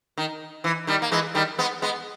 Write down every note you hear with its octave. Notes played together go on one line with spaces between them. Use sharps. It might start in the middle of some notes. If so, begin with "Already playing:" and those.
D#3
E3
D#3 G3
A#3
E3 G#3
D#3 G3
G#3 B3
G#3 B3